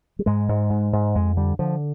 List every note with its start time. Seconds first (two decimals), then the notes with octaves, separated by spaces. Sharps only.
0.19 G3
0.26 G#2 G#3
0.49 G#2
0.70 G#2
0.93 G#2
1.15 F2 G#3
1.37 D3 G3
1.59 D3 F3